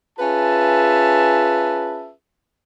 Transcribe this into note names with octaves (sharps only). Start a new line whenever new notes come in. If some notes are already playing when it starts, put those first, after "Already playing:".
C#4 F4 G#4 B4 E5 A5